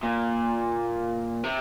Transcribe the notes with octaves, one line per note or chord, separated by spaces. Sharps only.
A#2
C3